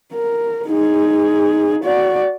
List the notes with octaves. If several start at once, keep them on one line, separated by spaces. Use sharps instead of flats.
A#4
D#4 G#4
F#4 D5